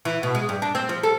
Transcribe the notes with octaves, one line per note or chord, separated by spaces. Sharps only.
E3
B2
G#3
G2
D4
C4
F3
A4